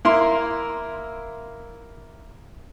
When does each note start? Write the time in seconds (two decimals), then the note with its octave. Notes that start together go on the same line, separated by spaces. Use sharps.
0.05 A#3 E4 A#4 C6